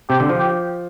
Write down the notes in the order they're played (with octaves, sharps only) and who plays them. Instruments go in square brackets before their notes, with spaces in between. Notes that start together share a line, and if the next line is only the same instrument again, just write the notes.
[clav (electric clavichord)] C3 [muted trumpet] G4
[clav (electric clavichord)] D3
F3
[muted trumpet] G4